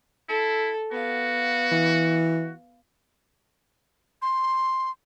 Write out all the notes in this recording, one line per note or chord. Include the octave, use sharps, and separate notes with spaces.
E4 A4
B3 F#4 F5
E3
C6